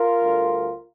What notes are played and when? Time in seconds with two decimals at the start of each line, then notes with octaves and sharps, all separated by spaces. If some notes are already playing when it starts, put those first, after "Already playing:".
Already playing: F4 A#4
0.21 D2 D3 G3